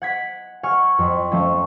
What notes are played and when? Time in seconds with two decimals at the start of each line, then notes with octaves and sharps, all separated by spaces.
0.02 F#5 G#6 B6
0.63 F#5 G#5 C#6 F6
0.99 F2
1.32 F3 A3 C#4